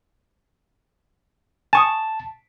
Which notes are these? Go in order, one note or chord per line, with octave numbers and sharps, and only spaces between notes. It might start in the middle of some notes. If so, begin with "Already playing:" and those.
G#5 A5 C#6 D#6